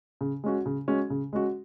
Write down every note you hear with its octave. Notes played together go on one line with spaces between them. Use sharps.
C#3
G#3 C#4 F#4
C#3
G#3 C#4 F#4
C#3
G#3 C#4 F#4